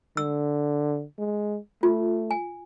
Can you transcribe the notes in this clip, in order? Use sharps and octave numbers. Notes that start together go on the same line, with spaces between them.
D3 E6
G#3
A3 F4
G#5